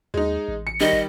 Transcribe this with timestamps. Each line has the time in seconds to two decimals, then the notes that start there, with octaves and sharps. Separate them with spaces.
0.14 D#2 G#3 D#4
0.48 A1
0.67 C#7
0.80 D#3 G3 D#5
0.93 G#1